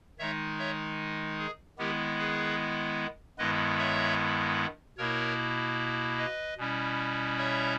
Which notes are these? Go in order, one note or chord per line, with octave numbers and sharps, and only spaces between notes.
D#3 G#3 D#4 C#5 E5
C#5 E5
G#4
D#3 G#3 B3 E4 G4 A#4
G#4 B4
G2 D#3 G#3 B3 E4 B4 D#5
C#5 E5
B2 A#3 E4 A#4 C#5
B4 D#5
B2 G3 C#4 E4
C#5 E5